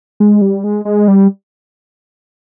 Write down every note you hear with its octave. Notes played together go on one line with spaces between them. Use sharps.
G#3
G3
G#3
G#3
G3